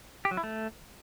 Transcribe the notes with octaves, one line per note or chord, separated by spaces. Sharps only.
G4
F#3
E4
A3